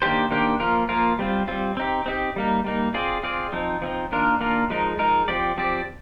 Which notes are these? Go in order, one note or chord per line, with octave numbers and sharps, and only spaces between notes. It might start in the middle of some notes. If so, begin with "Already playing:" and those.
D#3 A#3 D4 G4 C5
D#3 A#3 D4 G4 C5
F3 A#3 F4 A#4
F3 A#3 F4 A#4
G3 C4 F4
G3 C4 F4
C4 D#4 G4
C4 D#4 G4
G3 A#3 D#4
G3 A#3 D#4
C4 F4 G#4 D5
C4 F4 G#4 D5
F3 C4 D#4
F3 C4 D#4
D#3 A#3 D4 F4 A#4
D#3 A#3 D4 F4 A#4
F3 G#3 D#4 A#4
F3 G#3 D#4 A#4
F3 C4 G4 D5
F3 C4 G4 D5